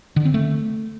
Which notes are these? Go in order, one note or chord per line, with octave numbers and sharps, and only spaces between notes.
D3
C4
A3